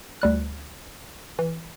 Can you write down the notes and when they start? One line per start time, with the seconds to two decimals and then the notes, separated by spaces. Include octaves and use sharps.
0.22 D2 G3 F#6
1.39 E3